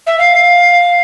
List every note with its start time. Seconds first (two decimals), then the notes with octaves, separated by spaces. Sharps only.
0.06 E5
0.18 F5